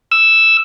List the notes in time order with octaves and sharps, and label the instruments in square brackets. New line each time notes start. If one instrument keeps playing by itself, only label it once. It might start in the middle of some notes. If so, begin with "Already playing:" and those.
[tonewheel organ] E6